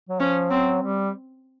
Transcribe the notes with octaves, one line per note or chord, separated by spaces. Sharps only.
F#3
F3 C#4
F#3 C4
G3